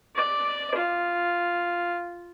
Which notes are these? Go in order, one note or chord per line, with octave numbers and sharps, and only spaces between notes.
D5
F4